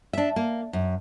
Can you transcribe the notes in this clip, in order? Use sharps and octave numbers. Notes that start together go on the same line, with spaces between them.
D4 E5
A#3
F#2